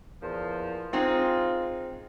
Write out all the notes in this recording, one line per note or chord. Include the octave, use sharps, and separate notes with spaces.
E2 A#2 F3
G#3 C4 D#4 F4